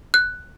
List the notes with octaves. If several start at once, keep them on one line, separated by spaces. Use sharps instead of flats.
F#6